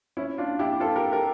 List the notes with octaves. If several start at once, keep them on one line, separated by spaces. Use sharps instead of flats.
C#4 E4
D4 F4
E4 G4
G4
F4 A4
G4 A#4
G4 A#4